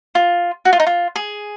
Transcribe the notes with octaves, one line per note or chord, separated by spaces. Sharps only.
F4
F#4
F4
D#4
F4
G#4